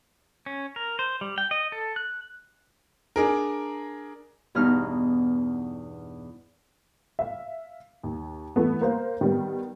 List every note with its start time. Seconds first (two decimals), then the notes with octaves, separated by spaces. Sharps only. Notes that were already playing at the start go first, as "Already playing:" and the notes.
0.46 C#4
0.76 A#4
0.99 C5
1.21 G3
1.38 G5
1.51 D#5
1.72 A4
1.96 F#6
3.16 D4 G#4 A#4
4.55 E2 G2 B2 D#4 F6
7.19 E5 F5
8.03 D#2
8.56 E3 A3 B3
8.81 A#3 C5 F5
9.21 D#3 G3 B3